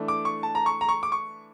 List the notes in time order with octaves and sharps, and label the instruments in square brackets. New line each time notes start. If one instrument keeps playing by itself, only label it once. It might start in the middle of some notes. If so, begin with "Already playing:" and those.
Already playing: [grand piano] E3 A3 D4
D6
C#6
A5
A#5
C#6
A#5
C#6
D6
C#6